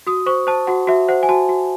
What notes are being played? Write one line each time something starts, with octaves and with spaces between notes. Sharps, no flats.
F#4 D#6
C5 C#6
C5 A5
F#4 F#5
F#4 E5
C5 F#5
G#5
F#4 A5
F#4